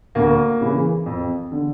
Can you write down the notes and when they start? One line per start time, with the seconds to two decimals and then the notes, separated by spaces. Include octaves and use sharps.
0.15 D2 A#3
0.61 C#3 E3
1.06 F2
1.51 D3